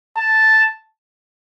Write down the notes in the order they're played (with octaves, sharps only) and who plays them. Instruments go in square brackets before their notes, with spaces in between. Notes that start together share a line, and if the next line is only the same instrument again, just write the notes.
[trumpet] A5